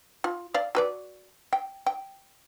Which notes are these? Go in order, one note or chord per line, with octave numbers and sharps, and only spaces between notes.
F4
D5 F5
F#4 B4 D5
G5
G5